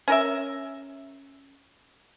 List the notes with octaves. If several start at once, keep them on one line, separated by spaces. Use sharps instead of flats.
C#4 A#4 E5